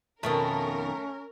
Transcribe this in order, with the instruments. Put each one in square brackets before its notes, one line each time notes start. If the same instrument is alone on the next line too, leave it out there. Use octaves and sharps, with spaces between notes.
[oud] F2 B2 D#3 [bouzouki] A3 [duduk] C#4 [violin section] A#4